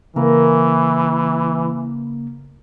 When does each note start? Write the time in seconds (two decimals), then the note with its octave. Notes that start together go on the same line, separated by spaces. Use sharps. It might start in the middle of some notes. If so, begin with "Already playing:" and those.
0.16 C#3 E3 A#3 A#4